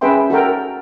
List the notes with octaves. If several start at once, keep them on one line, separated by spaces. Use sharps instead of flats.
C#4 G#4 B4 E5 G5 C6
F#4 A4 A#4 G5